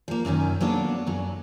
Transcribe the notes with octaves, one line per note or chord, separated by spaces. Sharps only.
F3 A#3
F#2 C3 D#3 C#4
F#3 A#3 B3 D4 A4
F#2 F#3